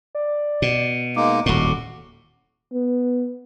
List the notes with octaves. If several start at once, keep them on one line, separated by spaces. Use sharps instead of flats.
D5
B2
G#3 A#3 D#4 D6
D#1 A2 F#4
B3